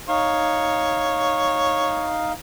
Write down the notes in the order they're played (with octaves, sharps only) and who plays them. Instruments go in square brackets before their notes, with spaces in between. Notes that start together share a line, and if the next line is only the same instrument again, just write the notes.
[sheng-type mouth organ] D#4 F5 [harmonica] C#5